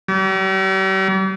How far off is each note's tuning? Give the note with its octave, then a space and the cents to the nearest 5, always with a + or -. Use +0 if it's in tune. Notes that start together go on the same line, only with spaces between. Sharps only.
G3 -45